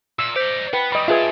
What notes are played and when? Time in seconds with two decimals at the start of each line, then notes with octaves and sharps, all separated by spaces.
0.19 A#2 E6
0.36 D#4 C5 D5 G6 B6
0.73 B3 B4 G5
0.92 F#3 G3 D#5 B5
1.08 D4 F4 G4 G#4 B4 E5 G#5